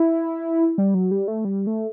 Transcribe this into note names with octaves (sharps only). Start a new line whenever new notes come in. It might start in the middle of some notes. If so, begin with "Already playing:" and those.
Already playing: E4
G3
F#3
G3
A3
G3
A3